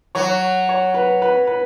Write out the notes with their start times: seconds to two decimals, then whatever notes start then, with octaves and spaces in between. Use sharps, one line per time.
0.15 F#3 C#5
0.69 C#5
0.94 B4
1.22 B4
1.47 B4